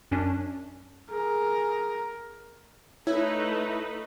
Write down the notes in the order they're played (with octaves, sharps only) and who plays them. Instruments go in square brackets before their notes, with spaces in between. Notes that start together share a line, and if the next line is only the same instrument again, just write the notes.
[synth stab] F#2 C#4 D4
[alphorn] G#4 [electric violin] A#4
[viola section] A3 D#4 B4 [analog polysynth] E4 [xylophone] C#5